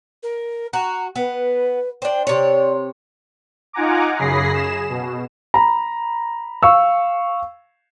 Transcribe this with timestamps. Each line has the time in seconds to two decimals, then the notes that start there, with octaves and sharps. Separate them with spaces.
0.23 A#4
0.73 F#4 A#5
1.16 B3 B4
2.02 D4 C5 G5
2.27 C3 C#5 D5
3.73 D#4 F4 F#5 G#5 A#5 D6
4.18 F#2 C#3 G#4 B5 A#6 C7
4.51 G#4 E7
4.89 B2
5.54 A#5 B5
6.63 F5 C#6 E6